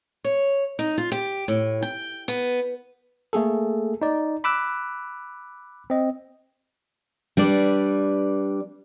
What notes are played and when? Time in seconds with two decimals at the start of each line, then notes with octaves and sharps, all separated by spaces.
0.24 C#5
0.79 D#4
0.98 F4
1.12 G4
1.48 A2
1.82 G5
2.28 B3
3.33 A3 A#3 G#4 A4
4.02 D#4 D5
4.44 B5 D6 E6 F#6
5.90 C4 D#5
7.37 G3 D4 B4 D5